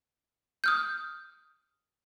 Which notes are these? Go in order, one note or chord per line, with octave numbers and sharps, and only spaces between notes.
D#6 F6 G6